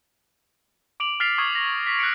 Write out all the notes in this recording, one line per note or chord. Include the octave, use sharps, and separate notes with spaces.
D6 D7 F7 F#7
F6 A6 B6 C7 F7
C#6 D#6 G#6
A#6
B6
F#6 A#6 C#7 D7